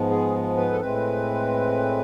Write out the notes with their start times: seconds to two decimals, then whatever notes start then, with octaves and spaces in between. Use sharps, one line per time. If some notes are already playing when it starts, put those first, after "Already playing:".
Already playing: G#2 F3 G#3 B3
0.10 G#4
0.57 B4
0.72 A4
0.81 A2 G#3 C4 B4